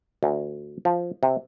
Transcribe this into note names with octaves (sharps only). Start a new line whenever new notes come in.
D2
F3
C3